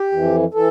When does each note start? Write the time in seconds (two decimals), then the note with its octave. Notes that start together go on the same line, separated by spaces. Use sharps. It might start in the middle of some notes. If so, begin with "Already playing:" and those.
Already playing: G4
0.12 F2 E3
0.54 E3 A4